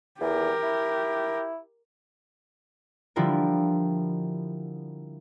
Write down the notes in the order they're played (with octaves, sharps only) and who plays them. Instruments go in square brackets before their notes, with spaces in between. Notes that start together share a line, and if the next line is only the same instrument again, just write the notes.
[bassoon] E2 [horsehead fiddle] G4 A#4
[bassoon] E4
[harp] D3 F3 G3 E4 F4 A#4